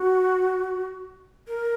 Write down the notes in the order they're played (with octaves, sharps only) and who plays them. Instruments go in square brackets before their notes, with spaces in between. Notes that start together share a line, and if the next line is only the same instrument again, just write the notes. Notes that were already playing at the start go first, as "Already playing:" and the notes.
Already playing: [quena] F#4
A#4